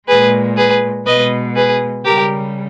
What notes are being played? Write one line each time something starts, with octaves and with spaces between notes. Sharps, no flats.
A#2 G#3 G#4 B4
G#4 B4
B2 G#3 B4 D#5
G#4 B4
C#3 G3 G4 A#4